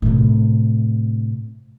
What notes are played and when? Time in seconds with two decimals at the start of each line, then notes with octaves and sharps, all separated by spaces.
0.02 A2 C3